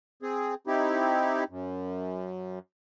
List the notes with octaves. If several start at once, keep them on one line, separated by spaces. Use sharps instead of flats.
C4 G#4
C4 D#4 E4 G4
F#2